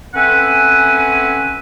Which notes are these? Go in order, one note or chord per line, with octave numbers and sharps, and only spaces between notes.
A3 C4 C#4 B4 F#5 G#5